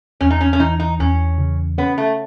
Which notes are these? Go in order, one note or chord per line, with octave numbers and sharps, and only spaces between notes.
E2 C#4
D#4
C#4
C#4
E3 D#4
D#4
E2 C#4
C#3
B3 C#4
A3